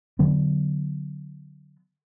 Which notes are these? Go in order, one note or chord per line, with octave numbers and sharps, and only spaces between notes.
D3 F#3 B3